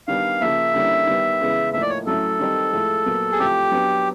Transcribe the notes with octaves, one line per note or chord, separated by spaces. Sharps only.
D#3 G3 B3 D4 F5
C#3 F3 A#3 E5
D3 G3 A#3 C#4 E4
D#3 G3 B3
C#3 E3 G#3 B3
A2 F3 A#3 D#4 E5
D5
C#5
A2 F#3 A3 C#4 E4 A4
D#3 G3 C4 D#4
A2 F3 G#3
A#2 F#3 B3
G#4
A2 F3 A3 C4 G4
F#3 B3 D4